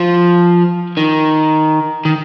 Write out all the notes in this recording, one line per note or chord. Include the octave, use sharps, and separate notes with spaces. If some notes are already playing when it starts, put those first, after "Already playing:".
Already playing: F3
D#3
D#3